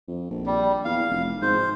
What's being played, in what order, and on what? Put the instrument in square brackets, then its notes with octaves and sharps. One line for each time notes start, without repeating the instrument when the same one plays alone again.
[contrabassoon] F2
A#1
[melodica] G3
[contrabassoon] E2 [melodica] F5
[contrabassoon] F1
[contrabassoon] G#2 [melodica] C5